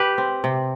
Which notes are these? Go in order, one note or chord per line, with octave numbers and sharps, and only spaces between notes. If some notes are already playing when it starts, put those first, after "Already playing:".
Already playing: G4 B4
C4
C3